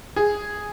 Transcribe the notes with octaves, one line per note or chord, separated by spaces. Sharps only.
G#4